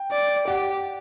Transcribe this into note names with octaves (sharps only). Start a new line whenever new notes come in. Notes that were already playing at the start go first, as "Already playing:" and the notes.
Already playing: G5
D5
G4 F#5